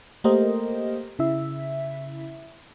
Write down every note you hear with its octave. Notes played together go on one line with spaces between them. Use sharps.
A3 A#3 G4 A#4 C5 D#5
C#3 E4 E5